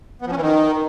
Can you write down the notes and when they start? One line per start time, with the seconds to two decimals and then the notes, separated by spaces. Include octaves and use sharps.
0.22 B3
0.27 F3
0.32 C#4
0.37 E3
0.42 D#3